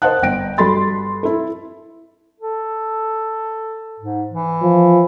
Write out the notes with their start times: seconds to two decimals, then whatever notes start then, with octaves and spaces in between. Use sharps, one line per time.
0.02 A#4 C5 D#5 F#5 A5 F#6
0.22 G1 G5 A#6 D7
0.58 G2 F#4 A4 B5 C6 A6
1.23 E4 A4
2.40 A4
4.00 G#2
4.33 E3
4.62 F3